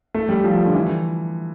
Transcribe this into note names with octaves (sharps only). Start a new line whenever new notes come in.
A3
G3
F3
D3
E3